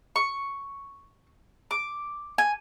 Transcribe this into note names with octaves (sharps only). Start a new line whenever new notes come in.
C#6
D6
G#5